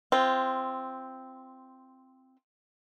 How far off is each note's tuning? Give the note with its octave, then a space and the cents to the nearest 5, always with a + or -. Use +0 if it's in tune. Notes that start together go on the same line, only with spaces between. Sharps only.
C4 +0 F4 -20